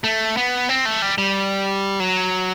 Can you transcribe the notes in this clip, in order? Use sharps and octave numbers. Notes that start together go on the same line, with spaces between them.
A3
B3
C4
A3
G3
G3
F#3